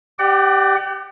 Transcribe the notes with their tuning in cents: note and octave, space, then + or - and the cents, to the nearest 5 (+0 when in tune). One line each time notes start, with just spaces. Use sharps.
G4 +0 D5 +30 F#5 +35